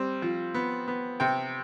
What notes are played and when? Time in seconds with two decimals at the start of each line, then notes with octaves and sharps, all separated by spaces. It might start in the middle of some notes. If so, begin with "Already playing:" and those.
Already playing: G3 C4
0.22 F3
0.54 B3
0.88 B3
1.20 C3 G5